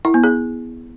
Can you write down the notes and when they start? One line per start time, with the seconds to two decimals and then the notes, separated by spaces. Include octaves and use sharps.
0.05 E4
0.14 B3
0.24 G#4